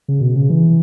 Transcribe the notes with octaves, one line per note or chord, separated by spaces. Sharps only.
C#3
B2
C#3
E3